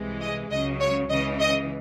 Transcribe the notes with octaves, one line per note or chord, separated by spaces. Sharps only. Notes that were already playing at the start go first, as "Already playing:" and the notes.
Already playing: C2 C3 E3 G#3
D#5
C#2 C#3 F#3 D#5
C#5
C#2 C#3 E3 D#5
D#5